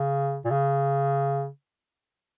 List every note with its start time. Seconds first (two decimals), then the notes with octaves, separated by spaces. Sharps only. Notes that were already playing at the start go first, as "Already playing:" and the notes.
Already playing: C#3
0.45 A#2
0.51 C#3